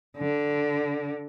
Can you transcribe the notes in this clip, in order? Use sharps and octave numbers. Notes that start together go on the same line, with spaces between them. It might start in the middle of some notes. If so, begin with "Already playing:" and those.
D3